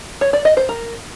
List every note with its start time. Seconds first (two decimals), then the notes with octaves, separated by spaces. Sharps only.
0.21 C#5
0.33 D5
0.45 D#5
0.57 C5
0.69 A#4